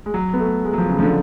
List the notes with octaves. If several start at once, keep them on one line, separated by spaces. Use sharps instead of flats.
G#3
F#3
B3
A3
G#3
F#3
F3
C#3
F3
D3